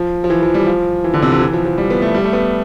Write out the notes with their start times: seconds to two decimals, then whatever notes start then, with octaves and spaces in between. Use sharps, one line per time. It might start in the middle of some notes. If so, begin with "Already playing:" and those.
Already playing: F3
0.24 F3
0.30 E3
0.43 F3
0.54 G3
0.67 F3
1.04 E3
1.14 D3
1.22 C3
1.32 D3
1.41 E3
1.53 F3
1.65 F3
1.78 G3
1.90 B3
2.02 A3
2.15 G3
2.24 A3
2.33 B3